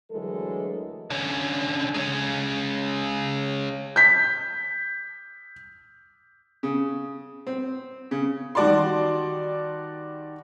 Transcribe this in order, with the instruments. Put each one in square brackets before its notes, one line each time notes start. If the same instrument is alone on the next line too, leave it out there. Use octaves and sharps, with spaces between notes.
[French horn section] D2 E3 F#3 G#3 A4 A#4
[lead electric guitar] D3 C#4
G#3 C#4
[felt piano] G6 B6
[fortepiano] C#3
C4
C#3
[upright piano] D#3 G3 F#4 D5 A5 C6